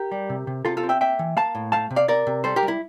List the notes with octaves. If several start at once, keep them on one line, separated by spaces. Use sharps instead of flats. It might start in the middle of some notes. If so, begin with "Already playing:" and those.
Already playing: G4 A#4
G3
C3
C3
C3 F4 A4
F4 A4
C4
E5 G5
A#3 E5 G5
E3
A#3 F5 A5
A2
A3 F5 A5
C3
D5 F5
C3 A#4 D5
C3
G3 A4 C5
G4 A#4
G3
E4